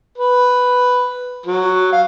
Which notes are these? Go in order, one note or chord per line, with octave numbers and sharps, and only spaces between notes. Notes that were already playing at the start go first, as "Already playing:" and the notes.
B4
F#3
F5